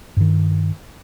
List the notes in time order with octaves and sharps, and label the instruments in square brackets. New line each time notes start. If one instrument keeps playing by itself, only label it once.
[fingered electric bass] G2 D#3